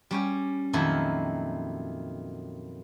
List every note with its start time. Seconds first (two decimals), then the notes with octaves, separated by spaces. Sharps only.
0.11 G3 C#4 G4
0.73 F2 A#2 D#3 F#3 E4